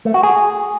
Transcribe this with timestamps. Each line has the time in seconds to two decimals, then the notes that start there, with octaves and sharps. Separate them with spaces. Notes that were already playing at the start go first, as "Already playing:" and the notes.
0.05 A3
0.14 F#4
0.23 G#4